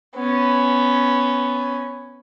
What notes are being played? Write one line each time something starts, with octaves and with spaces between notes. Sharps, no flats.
B3 C#4